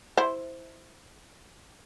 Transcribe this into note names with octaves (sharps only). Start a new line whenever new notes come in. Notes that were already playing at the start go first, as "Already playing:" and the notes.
E4 C5